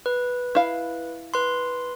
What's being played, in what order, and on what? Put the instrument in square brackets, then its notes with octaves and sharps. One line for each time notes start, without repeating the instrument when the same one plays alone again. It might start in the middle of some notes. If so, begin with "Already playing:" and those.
[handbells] B4
[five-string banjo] E4 F5
[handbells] B4 C6